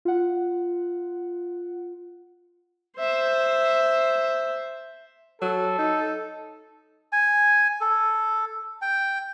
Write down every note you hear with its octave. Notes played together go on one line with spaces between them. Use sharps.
F4 F#5
C5 E5
F#3 A4
D#4
G#5
A4
G5